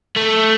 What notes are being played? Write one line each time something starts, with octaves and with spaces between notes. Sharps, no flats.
A3